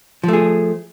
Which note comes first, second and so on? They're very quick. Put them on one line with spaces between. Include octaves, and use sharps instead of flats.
F3 A3 G#4